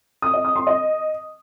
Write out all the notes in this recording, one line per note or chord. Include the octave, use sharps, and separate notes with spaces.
D#6
D#5
D#6
C6
D#5